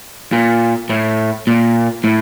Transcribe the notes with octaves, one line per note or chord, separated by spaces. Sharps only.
A#2
A2
A#2
A2